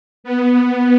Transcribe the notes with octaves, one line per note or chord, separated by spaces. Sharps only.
B3